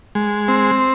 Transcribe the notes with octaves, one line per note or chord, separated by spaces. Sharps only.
G#3
C4